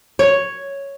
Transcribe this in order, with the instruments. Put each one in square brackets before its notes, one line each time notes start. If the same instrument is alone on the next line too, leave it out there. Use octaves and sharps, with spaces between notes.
[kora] C#5